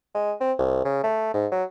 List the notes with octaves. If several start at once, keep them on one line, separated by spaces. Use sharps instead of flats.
G#3
C4
C2
C#3
A3
G#2
F#3